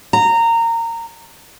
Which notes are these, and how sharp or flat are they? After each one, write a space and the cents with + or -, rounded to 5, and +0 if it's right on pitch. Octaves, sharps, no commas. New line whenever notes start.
A#5 -20